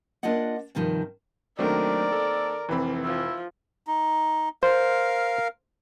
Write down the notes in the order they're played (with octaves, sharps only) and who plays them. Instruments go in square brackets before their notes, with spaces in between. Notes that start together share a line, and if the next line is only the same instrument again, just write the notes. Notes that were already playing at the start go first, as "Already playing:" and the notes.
[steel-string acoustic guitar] A#3 D4 F4 D5 D#5 F#5
G2 C3 D#3 F3
[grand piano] D#3 A#3 C4 [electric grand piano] F#3 A3 D4 [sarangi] A#4 [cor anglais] D5
[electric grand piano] A4
[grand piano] F1 B5 [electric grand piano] E3 C4
[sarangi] F3 [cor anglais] E4
[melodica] D#4
[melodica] A#4 F5 [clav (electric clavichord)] C5